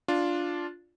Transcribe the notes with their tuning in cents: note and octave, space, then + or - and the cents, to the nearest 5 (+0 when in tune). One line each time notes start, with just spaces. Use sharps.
D4 -5 F4 +0